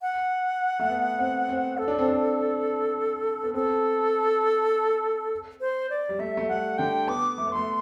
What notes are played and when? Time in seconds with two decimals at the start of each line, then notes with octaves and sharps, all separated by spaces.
0.02 F#5
0.79 A3
0.90 B3
1.19 C4
1.49 C4
1.78 A4
1.88 D4
1.99 C4
2.08 D4
3.44 B3
3.54 C4 A4
5.61 C5
5.90 D5
6.09 G3
6.19 A3 E5
6.37 A3
6.49 G3 F#5
6.78 D3 G5
7.07 B3 D6
7.38 A3
7.47 B3
7.52 A3 C6